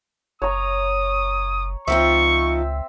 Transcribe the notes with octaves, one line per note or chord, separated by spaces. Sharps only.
F#1 C#5 A#5 D#6
C#2 F3 C4 D#4 F4 E5 C#6